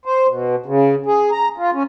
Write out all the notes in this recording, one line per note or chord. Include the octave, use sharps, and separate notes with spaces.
C5
B2
C#3
G#4
A#5
F4
C#4